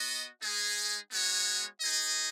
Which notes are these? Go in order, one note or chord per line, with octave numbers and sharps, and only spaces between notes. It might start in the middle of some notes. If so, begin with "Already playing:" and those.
Already playing: B3 F#4 D#5
G#3 D#4 G#4
G#3 B3 F#4 C#5
D#4 G#4 D#5